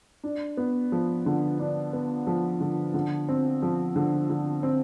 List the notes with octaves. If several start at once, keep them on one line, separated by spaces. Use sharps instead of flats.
D4
B3
F3
D3
D4
B3
F3
D3
D3
C4
F3
D3
D3
C4